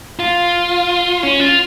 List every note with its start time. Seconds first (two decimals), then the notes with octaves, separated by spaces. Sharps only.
0.19 F4
1.23 C#4
1.40 F4